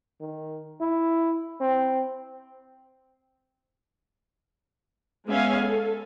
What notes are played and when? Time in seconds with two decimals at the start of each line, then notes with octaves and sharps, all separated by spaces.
0.20 D#3
0.81 E4
1.61 C4
5.27 G#3 B3 C#4 E5 F5 G#5
5.62 A4